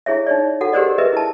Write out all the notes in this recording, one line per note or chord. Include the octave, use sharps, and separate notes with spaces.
E4 G#4 C#5 E5
D#4 C#5 D5
F#4 A4 F#5
G4 G#4 A#4 C5 D5 D#5
G#4 A#4 B4 D#5 E5
E4 A5